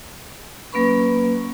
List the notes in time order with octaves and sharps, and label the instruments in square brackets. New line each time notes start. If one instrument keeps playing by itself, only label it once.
[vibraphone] F#3 A#3 C#4 B4 B5 C#6